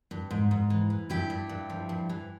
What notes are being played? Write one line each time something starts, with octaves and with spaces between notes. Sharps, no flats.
G2
G#2
G#2
E3
E3
G2 E4 G4
G2
G2
F3
G2
E3